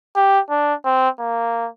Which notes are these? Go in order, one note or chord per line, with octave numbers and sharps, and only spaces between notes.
G4
D4
C4
A#3